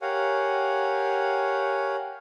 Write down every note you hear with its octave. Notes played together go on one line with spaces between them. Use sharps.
G4 A#4 C#5 F5 F#5 G#5